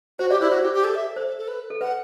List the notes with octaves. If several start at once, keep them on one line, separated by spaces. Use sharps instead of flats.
F#4 C5
G4 D5
E4 C5
F#4 C5
G4
G4
A4
E5
A4 C5
A4
A4
B4
A4
B4 F#5